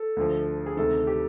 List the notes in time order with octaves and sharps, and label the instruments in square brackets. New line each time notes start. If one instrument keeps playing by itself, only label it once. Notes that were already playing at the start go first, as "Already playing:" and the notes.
Already playing: [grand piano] A4
D2 D3 F3
G#4
D2 C3 D#3 A4
G4